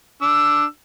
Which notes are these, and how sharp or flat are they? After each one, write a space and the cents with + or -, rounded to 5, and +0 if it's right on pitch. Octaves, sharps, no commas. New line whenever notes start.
D4 +0 E6 +10